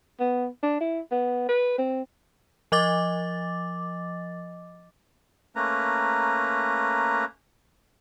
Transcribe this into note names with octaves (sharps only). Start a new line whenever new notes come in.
B3
D4
E4
B3
B4
C4
F3 D#5 D6 A6
A3 A#3 C#4 B4 A#5